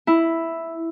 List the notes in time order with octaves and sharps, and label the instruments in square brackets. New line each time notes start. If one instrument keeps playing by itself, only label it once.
[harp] E4